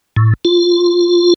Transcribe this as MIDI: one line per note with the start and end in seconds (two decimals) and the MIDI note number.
0.16 0.34 45
0.45 1.34 65